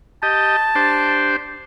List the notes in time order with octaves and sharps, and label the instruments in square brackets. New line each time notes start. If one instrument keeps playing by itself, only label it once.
[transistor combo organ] G4 D#5 [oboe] A5
[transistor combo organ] D4 G4 C5